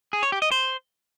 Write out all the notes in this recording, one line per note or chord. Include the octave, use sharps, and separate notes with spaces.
G#4
C#5
G4
D#5
C5